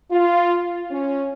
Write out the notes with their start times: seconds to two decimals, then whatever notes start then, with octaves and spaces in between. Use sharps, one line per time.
0.12 F4
0.91 C#4